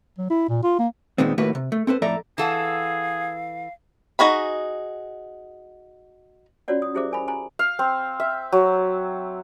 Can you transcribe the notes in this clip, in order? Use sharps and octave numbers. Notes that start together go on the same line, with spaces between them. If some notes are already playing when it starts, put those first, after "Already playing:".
F#3
E4
A#2
F4
A#3
A#2 D#3 G#3 B3 C4
D#2 A2 A3 A#3 F#4 B4
C3
A3
C4 A4 B4 C5
F2 A2 A4 D5 E5 A#5
E3 G#4 A4 F5 F#5
D#4 F#4 G#4 B5
C#4 F4 F#4 C#5 D5 F#5
D#6
E4 G4 G#4 C5 E5 D6
A#4 G#5 B5
G#5 A#5 C6
F5
C4
E5
F#3